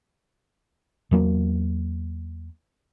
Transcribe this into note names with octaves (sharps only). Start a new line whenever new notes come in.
E2 F#3 A#3